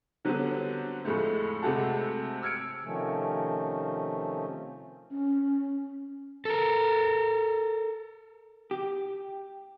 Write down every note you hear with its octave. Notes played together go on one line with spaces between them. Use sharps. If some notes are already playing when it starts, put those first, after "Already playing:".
D3 F#3 G3 B3 C4
F2 A2 G#3 A3
C3 G#3 A3 F#4 A4
E6 F6 G#6 C#7 D7
C3 D#3 F3 A3 C#4
C#4
A4 A#4
G4